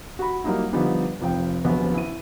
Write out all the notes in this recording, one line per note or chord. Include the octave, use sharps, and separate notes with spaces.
F#4 B5
F#3 G3 A#3 D#4 E4
D3 F3 G3 B3 D#4
F1 F3 G5
D#1 A#1 C#3 F#3 B3
E4 D#7